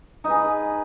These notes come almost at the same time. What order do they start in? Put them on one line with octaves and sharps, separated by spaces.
D#4 B4 G#4